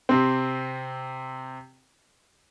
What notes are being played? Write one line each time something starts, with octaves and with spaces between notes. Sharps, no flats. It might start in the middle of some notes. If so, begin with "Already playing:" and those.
C3 C4